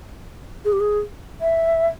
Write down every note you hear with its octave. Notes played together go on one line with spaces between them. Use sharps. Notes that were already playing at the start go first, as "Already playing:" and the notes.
G#4
G4
G#4
E5